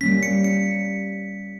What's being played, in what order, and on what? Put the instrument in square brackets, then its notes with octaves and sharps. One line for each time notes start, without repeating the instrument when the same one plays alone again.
[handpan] G3 A#3 C#4 [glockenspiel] B6
[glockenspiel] C#7
C#7